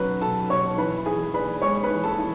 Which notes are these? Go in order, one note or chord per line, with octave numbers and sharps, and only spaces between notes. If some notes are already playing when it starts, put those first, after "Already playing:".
Already playing: B2 F#3 C#4 B4 B5
B2 A4 A5
B2 C#5 C#6
E3 B4 B5
E3 G#4 G#5
D4 B4 B5
G#3 C#5 C#6
B4 B5
E3
A4 A5
E3